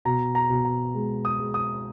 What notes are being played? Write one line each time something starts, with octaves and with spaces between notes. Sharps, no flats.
B2 A#5
A#5
B2
A#5
G#3
D#6
G#3
D#6